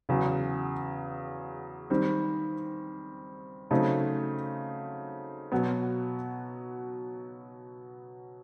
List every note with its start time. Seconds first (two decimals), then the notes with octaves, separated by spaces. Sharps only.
0.09 E2 C#3 F#3
1.90 D#3 G3 C4
3.71 C#3 F#3 A3 C4 D#4
5.52 B2 F#3 B3